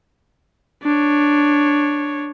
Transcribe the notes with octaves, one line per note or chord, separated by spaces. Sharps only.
D4 C#5